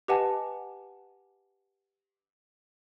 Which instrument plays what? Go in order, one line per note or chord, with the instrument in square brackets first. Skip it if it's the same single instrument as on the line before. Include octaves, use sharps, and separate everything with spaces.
[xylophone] G4 B4 D#5 F#5 G#5 A5